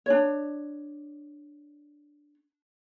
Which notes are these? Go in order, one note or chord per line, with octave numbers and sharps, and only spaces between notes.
D4 C#5